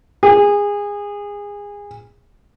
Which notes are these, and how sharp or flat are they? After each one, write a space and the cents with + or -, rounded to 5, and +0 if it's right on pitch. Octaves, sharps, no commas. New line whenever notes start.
G#4 -25